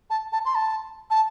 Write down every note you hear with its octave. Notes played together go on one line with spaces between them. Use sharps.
A5
A5
C6
A5
A5